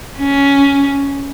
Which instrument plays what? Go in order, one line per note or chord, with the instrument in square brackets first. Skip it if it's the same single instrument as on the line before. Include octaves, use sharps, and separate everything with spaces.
[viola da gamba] C#4